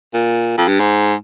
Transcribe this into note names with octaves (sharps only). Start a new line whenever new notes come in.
A#2
F2
G2
G#2